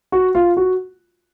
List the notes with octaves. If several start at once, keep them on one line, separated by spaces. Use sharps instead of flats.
F#4
F4
F#4